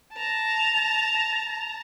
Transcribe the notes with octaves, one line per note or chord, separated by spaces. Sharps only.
A5 A#5